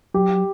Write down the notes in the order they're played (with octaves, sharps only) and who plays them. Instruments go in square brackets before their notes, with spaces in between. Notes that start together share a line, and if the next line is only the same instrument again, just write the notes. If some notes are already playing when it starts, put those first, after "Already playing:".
[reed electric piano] F#3 [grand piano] G4